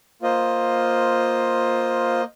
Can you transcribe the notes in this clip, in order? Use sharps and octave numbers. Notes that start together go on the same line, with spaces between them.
A#3 F4 C5 D#5